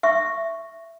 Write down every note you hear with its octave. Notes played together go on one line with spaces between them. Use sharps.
E5 C#6